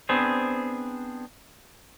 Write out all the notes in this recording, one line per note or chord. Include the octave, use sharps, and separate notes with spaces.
B3 C4 D4 G#4 C5